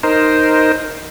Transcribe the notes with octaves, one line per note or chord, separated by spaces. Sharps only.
D#4 A#4 C5